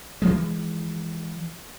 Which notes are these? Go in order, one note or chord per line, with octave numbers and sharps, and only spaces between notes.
E3 F3 G#3